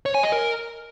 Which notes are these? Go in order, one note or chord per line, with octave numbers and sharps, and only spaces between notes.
C#5
G#5
D#5
A#4